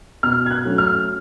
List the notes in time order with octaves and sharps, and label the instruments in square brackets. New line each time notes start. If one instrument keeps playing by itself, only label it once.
[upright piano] B2 F6
G#6
F#6
F#3 A3 C#4
F6